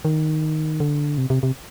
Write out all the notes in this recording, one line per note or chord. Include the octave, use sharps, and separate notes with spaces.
D#3
D3
C3
C3
C3